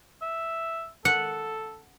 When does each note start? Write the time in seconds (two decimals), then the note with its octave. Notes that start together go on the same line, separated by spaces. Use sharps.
0.22 E5
1.05 A4 F#5